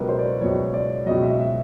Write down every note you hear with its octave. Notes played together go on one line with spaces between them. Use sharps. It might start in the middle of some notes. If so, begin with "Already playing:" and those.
Already playing: C#2 B2 F#3 A#4 B4
C5
D5
C#5
C#2 B2 F#3 C#5
D5
C#2 B2 F#3 D#5
E5
E5